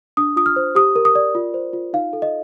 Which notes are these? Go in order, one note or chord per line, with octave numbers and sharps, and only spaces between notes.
D4 D#6
F4 D#6
F6
C5
G4 D#6
A#4
D#6
D5
F4
C5
F4
D#4 F5
A4
D#5